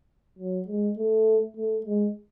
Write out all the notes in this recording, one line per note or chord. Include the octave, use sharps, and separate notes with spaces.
F#3
G#3
A3
A3
G#3